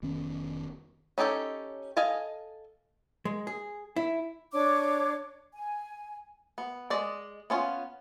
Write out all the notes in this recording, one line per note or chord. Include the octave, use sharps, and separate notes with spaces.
F1 D#3 B3 C#4
C#4 D#4 G4 A4 C#5
A4 D#5 F5 G#5
G#3
G#4
E4
D4 C#5 D6
G#5
B3
G#3 D5 D#5
B3 C#4 F4